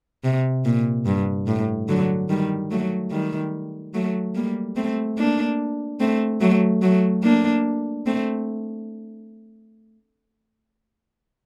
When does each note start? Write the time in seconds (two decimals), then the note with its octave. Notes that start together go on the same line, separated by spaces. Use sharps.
0.24 C3
0.65 A#2
1.06 G2
1.47 A2
1.89 D3 F#3
2.29 D#3 G3
2.71 F#3 A3
3.11 D#3 G3
3.94 F#3 A3
4.35 G3 A#3
4.76 A3 C4
5.18 A#3 D4
6.00 A3 C4
6.41 F#3 A3
6.82 F#3 A3
7.23 A#3 D4
8.07 A3 C4